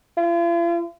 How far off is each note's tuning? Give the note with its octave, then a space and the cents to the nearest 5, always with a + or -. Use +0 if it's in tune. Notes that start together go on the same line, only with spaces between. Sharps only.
F4 -45